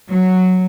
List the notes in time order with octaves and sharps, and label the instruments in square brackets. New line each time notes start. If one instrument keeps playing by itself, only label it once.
[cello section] F#3